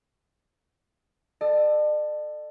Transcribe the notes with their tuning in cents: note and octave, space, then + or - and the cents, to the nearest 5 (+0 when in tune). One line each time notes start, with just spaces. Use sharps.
A4 +0 D5 +45